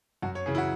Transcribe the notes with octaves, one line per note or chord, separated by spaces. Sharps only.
F#2 F#4
C#5
C#3 E3 G#4
E4
F#4